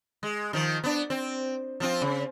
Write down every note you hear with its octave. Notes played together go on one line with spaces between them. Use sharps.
G#3
D#3 F3
B3 D4
C4
F3 C4 F4
C#3